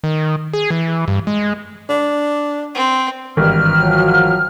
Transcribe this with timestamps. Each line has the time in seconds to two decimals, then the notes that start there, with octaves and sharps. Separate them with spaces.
0.04 D#3
0.53 G#4
0.70 E3
1.08 G2
1.27 G#3
1.89 D4
2.75 C4
3.37 G#1 G2 E3 F6
3.79 F3 F#3